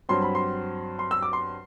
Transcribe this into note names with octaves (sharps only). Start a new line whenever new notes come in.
G2 F#3 C4 C6
B5
C6
C6
E6
D6
C6